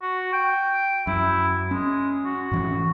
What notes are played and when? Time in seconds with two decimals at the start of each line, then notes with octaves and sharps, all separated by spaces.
0.02 F#4
0.33 G5
1.07 F#2 E4
1.71 G#3 C#4
2.25 F#4
2.52 G#2 E3 C#4